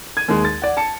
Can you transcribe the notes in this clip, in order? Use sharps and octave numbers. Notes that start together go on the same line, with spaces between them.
G#6 D#7
D#2 G#3
A6
D5 F#5
A5 C#7